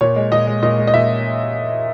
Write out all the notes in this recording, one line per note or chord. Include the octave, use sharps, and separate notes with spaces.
A#2 C#5
G#3
A#2 D#5
G#3
A#2 D#5
G#3
D#5
A#2 E5